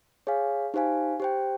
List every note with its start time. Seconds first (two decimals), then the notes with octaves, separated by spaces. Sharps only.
0.27 G#4 C#5 F5 G#5
0.74 D#4 G4 C5 F5 G#5
1.20 G4 C5 G5